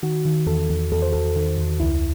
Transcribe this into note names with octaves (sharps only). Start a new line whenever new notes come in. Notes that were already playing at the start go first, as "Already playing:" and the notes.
D#3 F#4
D#3
E2 A4
E2
E2 A4
C5
E2 A4
D#3
E2
C#2 E4